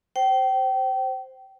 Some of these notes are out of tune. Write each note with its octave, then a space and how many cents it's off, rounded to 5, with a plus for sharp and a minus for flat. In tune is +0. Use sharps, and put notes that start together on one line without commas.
C5 +0 G5 -30